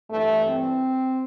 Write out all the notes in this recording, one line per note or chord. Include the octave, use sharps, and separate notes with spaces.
G2 E3 A3
C4